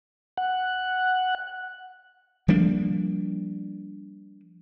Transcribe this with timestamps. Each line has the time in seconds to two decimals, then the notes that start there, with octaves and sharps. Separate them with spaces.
0.37 F#5
2.48 F3 G3 A#3 D4